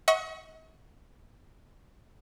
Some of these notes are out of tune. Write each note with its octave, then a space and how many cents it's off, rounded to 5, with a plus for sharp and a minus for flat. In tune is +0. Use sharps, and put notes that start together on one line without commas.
D#5 +45 F#5 +0 C#6 +0